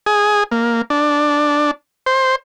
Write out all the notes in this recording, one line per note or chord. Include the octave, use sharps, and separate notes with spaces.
G#4
A#3
D4
C5